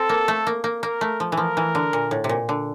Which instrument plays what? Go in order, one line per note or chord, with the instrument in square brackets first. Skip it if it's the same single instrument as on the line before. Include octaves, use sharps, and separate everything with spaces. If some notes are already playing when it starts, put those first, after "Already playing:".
Already playing: [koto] C4 [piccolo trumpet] A4
[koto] A#3
A3
A#3
A#3
[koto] A#3 [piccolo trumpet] A#4
[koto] A3
F3
E3
[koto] F3 [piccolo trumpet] A#4
[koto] E3
D3
A#2
A2
C3
A#2
D3